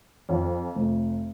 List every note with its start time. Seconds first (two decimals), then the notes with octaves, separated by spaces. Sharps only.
0.29 F2 F3
0.75 F1